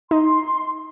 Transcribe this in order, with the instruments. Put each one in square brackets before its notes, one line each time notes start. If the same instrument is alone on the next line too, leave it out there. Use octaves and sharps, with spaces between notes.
[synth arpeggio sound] D#4 [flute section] C6